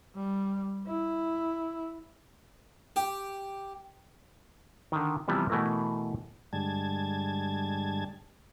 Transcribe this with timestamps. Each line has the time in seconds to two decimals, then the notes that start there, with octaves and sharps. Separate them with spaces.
0.15 G3
0.87 E4
2.96 G4
4.92 D3 D#3
5.28 C3 E3 F3 G3 B3
5.50 B2 E3 A3 E4 A#4
6.53 G2 D3 G3 G#3 A5 G#6